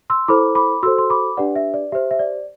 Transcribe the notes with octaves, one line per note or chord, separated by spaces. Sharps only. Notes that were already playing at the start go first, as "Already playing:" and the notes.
C6 E6
E4 A4 C5 B5 D6
B5 D6
F#4 A4 C5 C6 E6
C6
B5 D6
D4 G4 B4 D5 F#5
E5
D5
G4 C5 E5
E5
D5